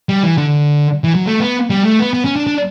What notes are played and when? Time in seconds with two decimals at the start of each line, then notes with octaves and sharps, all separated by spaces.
0.09 G3
0.23 E3
0.38 D3
1.04 E3
1.15 F#3
1.26 A3
1.40 B3
1.70 G3
1.84 A3
1.99 B3
2.14 B3
2.25 C#4
2.36 D4
2.47 D4